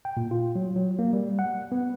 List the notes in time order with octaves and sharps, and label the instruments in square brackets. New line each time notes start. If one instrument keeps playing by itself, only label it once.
[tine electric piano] G5
A#2
F4
F#3
F#3
A#3
G3
F#5
B3